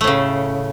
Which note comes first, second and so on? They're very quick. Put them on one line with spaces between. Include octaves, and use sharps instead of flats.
A3 A2 C#3